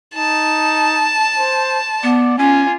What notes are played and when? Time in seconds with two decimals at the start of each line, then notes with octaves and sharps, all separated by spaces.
0.15 D#4 A5
1.37 C5
2.03 B3 D5
2.39 C#4 F4 G#5